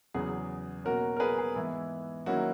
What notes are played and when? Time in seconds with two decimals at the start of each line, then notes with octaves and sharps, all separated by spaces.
0.14 E2 C#3 F#3 B3 G#4
0.84 B2 A#3 C#4 F#4 A#4
1.16 A#4
1.20 G#4 B4
1.38 G#4
1.56 G#2 E3 B3 E4
2.26 D#3 F#3 A#3 C#4 E4 F#4